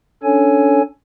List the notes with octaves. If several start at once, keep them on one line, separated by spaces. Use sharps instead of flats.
C#4 D4 A4 C#5 G#5